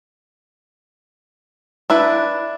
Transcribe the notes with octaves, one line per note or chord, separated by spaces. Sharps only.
D4 E4 B4